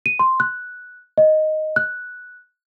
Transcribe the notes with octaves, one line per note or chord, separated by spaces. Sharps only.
D#7
C6
F#6
D#5
F#6